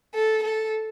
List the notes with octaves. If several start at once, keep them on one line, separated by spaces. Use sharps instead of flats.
A4
A4